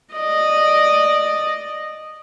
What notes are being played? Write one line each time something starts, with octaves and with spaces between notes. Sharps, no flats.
D5 D#5